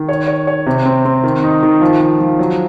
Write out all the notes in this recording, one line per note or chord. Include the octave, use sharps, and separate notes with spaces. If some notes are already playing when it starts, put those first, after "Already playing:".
Already playing: D#3
C#5
C#5
C#5
C3
C4
C4
D#3
D#4
D#3
F3
F3
F3
F#3